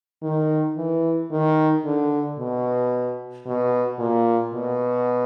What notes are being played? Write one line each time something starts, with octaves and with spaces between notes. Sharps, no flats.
D#3
E3
D#3
D3
B2
B2
A#2
B2